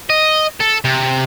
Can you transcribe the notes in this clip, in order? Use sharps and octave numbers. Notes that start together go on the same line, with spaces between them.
D#5
A4
C3